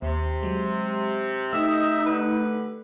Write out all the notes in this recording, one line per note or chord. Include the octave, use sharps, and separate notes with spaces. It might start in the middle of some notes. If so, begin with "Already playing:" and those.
D#2 C3
F#3 G#3
A3 D#4 G4 D#5 E5
D3 B4